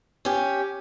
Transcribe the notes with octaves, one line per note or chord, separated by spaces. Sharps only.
C#4 G4